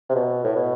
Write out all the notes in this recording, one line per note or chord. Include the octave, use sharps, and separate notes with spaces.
C3
B2
A2
B2